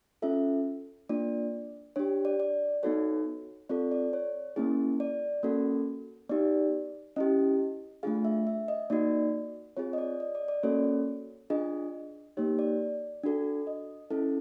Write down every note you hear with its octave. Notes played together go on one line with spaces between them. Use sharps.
C#4 F4 A4 E5
A#3 D4 F4 D5
D4 G4 C#5
D5
D5
B3 D#4 F#4 A4 C#5
C4 F4 A4 D5
D5
C#5
A#3 C#4 E4 G#4
D5
A#3 C#4 F#4 A4
B3 D#4 G4 D5
C#4 E4 G4 D#5
A3 D4 F4 G#4 F5
E5
E5
D#5
A#3 D#4 F#4 D5
C4 F4 G#4 C#5
D#5
D5
D#5
D5
D5
A#3 C#4 F#4 A4 C#5
D4 F4 G#4 D#5
A#3 D#4 G4 C#5
D5
D4 F#4 A4
D#5
C#4 E4 A4